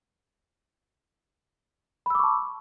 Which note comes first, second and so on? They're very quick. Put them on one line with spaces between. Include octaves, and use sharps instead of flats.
B5 E6 D6 C#6 A5